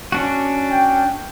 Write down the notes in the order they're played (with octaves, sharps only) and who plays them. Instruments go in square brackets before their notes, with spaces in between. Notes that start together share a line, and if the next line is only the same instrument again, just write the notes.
[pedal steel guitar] C#4 D4 F#4
[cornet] G5